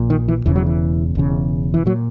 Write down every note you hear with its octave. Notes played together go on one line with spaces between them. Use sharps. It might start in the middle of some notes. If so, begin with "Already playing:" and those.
Already playing: A#1 A#2
D#3
E3
E1 E2 C#3 E3
F#3
E3
E1 E2 C#3
E3
A#2 F#3